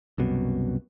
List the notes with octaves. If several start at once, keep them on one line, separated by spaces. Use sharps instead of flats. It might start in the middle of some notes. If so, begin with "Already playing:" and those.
C2 F#2 B2